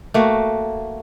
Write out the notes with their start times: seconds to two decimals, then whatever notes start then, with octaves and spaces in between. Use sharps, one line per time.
0.14 A3 A#3 F#4